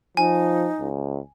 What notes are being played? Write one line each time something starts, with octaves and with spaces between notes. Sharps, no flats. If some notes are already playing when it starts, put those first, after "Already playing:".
F3 D#4 G#5
C#2